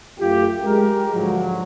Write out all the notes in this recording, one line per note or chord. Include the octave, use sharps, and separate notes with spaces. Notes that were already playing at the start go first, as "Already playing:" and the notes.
F#2 A3 F4 G4
G#3 G4 A#4
G#2 D3 F3 F#3